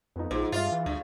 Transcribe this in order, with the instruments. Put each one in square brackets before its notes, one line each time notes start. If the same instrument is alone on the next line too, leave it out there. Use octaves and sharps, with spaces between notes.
[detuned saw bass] F2 [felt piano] B3 D#4
[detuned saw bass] A#1 [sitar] G#2 [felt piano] F3 F4 C5
[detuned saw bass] G2 [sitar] F4 [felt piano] E5 F5 A6
[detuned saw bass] E3
[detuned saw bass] D2 [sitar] G2